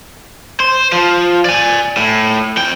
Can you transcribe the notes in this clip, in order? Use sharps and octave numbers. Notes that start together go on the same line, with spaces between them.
C5
F3
D5 G#5
A2
F2 G5